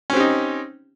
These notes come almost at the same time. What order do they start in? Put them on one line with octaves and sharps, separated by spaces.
C#4 C4 G4 D#4